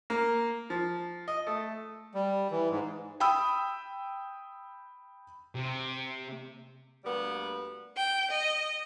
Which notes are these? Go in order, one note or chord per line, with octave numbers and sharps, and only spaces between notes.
A#3
F3
D#5
A3
G3
E3
G#2
G5 B5 D#6 E6
C3
D2 G3 A#3 B3
G5
D#5